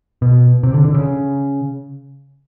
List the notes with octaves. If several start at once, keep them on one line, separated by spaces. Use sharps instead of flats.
B2
C3
D3
D3
C#3